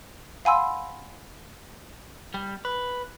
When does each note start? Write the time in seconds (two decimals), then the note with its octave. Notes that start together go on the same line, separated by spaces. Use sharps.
0.45 F5 F#5 G#5 B5 C6 E6
2.34 G3
2.65 B4